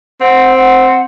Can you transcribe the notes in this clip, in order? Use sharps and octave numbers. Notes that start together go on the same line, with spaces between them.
C4 F#5
F#5